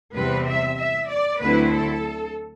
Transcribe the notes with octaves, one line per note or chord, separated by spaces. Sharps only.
E2 C3 G3 C4 B4
E5
E5
D5
D2 D3 F#3 C4 E4 B4
A4